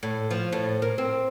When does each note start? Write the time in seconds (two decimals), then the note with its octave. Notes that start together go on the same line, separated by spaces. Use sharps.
0.03 A2
0.31 F3
0.52 A2
0.82 A#4
0.98 C4